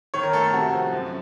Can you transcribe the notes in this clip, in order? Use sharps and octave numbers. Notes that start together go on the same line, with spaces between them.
D#3 C#5
A#4
A3 A4
A4
C3 F#4
F3
F#2